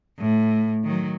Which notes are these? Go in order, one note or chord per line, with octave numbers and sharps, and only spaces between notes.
A2
D#3 F#3